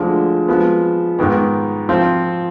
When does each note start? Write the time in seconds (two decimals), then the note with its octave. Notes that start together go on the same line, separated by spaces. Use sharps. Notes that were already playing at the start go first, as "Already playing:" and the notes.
Already playing: D2 D3 F3 G#3
0.48 F3 G#3 B3
1.19 G#2 D#3 B3
1.89 F3 C4 F4